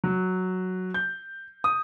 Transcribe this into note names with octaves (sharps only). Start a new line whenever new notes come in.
F#3
G6
D#6